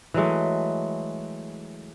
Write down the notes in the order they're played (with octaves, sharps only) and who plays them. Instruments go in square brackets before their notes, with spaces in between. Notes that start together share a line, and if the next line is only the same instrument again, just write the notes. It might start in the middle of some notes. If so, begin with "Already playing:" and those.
[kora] E3 F#3 G#3 A3